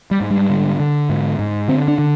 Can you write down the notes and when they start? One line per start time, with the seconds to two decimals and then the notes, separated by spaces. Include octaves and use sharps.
0.11 G3
0.21 G#2
0.31 G3
0.50 D3
0.80 D3
1.09 G#2
1.39 G#2
1.68 D3 C4
1.88 D4
1.98 D3